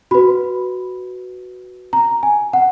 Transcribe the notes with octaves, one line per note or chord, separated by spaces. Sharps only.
F#4 B4 B5
A#5
G#5
F#5